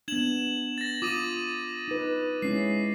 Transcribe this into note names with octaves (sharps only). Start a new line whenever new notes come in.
B3 D4 G#6 E7 F#7
A6 A#6
F4 D6 D#6 D#7
D#4 B4
G#3 C#4 E4 C7